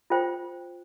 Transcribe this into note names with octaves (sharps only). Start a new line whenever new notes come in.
F4 C5 G5